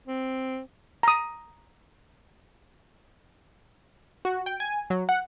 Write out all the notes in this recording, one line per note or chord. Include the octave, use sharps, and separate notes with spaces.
C4
A#5 D#6
F#4
G5
G#5
F#3
F#5